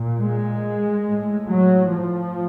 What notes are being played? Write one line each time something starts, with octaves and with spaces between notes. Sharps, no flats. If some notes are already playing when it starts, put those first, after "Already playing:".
Already playing: A#2
G#3
A2
F#3
F3